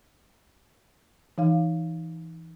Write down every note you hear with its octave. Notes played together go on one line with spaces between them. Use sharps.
E3 D#4 F5